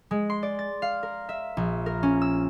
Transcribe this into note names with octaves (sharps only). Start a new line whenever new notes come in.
G#3
C6
D5
A6
F5
A#4
E5
A#1
A#4
C#4
E6